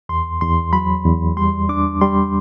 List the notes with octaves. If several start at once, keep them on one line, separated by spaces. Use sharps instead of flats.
E2 C6
E2 C6
F#3 B5
E2
G3 C6
D4 D6
G3 C6